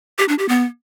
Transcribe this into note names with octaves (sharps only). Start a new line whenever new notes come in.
G4
D4
G4
B3